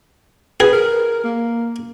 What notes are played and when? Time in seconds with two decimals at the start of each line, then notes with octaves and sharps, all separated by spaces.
0.60 G#4 B4
0.73 A#4
1.24 A#3